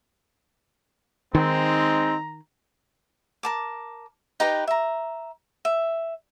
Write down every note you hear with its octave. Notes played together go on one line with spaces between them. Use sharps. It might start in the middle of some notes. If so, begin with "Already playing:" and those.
D#3 G#3 C4 D#4 A#5
A#4 A5 D6
D#4 G4 B4 A#5
E5 A#5
E5